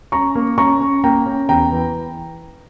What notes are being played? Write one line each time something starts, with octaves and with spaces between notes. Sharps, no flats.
C#4 A#5 C#6
A#3
C#4 A#5 C#6
C#4
A#3 G5 A#5
C#4
E2 G5 A#5
E3